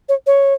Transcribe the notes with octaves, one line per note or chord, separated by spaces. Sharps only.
C#5
C#5